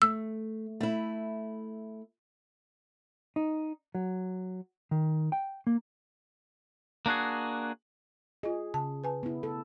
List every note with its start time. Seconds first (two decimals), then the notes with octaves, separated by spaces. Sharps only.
0.02 A3 E6
0.80 A3 E4
3.36 D#4
3.95 F#3
4.91 D#3
5.32 G5
5.67 A#3
7.06 A#3 D4 F#4 G#4
8.43 F4 G#4 D#5
8.74 C#3 A5
9.04 B4 G#5 A5
9.23 B3 E4
9.43 A4